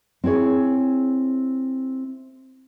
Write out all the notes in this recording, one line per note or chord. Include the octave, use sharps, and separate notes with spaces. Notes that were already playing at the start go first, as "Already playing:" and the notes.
C4 E4 G#4 C#5